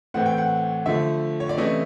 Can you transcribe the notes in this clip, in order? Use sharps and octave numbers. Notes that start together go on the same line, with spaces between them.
A2 E3 A3 C4 F#5
G5
F#5
D3 F3 A3 E5
C#5
D5
C3 E3 A3 C#4 E4 D#5